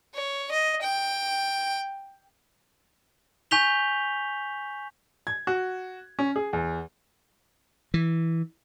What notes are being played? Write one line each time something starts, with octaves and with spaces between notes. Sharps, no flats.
C#5
D#5
G5
G#5 C#6 G6 B6 F7 G7
G#6
F#4
C#4
G#4
E2
E3